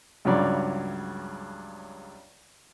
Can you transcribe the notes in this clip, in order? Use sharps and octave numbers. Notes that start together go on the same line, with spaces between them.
C#2 G2 C#3 F#3 D5